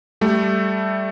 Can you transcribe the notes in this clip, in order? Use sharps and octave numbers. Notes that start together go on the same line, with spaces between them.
G3 A3